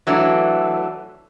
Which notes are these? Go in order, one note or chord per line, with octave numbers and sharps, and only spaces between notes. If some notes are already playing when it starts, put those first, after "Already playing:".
E3 F#3 A3 D4